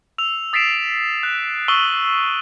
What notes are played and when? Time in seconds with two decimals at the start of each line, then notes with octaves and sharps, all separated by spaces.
0.18 E6 F7
0.53 D#6 A6 B6 C7 D7 E7
1.23 F#6
1.68 C#6 D#6 E6 D#7 F#7 G7